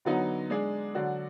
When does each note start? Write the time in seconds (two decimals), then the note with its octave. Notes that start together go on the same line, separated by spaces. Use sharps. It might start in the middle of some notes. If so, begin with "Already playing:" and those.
0.05 D3 F#3 B3 D#4
0.50 G#3 D4 G#4
0.95 D3 F#3 D4 F#4